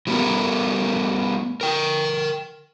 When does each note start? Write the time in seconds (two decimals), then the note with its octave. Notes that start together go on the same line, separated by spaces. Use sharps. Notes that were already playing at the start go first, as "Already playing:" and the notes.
0.07 E3 G3 A3 B3 A#4
1.61 A#4 G5